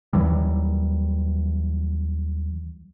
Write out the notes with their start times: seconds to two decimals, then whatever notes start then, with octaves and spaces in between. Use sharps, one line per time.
0.13 D#2 E3 F#3 G3